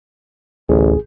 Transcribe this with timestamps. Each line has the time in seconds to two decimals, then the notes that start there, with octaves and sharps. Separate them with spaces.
0.69 A1 D2 G#4